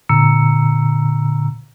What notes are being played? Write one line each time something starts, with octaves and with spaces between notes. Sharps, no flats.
A#2 D3 A#5 E6 C#7